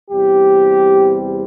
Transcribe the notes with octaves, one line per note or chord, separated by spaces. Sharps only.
E2 C3 G3 C4 G4